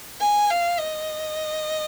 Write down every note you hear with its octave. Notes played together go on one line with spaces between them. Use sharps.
G#5
F5
D#5